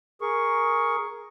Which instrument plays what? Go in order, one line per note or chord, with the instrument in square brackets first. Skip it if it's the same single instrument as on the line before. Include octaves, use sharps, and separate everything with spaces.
[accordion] G#4 A#4 C#6